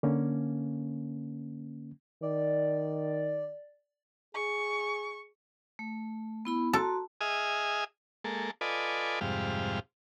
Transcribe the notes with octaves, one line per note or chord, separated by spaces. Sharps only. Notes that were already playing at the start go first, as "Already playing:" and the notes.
D3 A#3 C#4
D#3 D5
G#4 C#6
A3
B3 E4 B5
F#4 A4 A#5 C6
G#4 D#5 E5 G#5 D#6 F6
G#3 A#3 A4
F4 A4 B4 D5 D#5 G#5
F2 G#2 C3 G3 F5